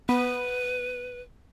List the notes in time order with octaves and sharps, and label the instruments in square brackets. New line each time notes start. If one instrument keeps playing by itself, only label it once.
[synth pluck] B3 [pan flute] B4